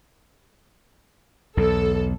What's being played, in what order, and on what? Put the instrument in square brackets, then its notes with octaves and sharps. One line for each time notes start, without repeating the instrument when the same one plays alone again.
[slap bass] B1 E2 [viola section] A4